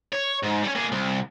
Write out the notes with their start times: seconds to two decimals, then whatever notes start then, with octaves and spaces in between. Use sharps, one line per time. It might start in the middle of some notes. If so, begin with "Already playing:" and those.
0.13 C#5
0.44 G#2
0.64 G3 C#4
0.75 A#3 G#4
0.92 C2